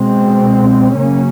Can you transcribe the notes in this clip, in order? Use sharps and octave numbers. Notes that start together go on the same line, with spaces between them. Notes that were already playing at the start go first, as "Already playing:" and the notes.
Already playing: B2 G#3 C4
C#3 F#3 A#3 C#4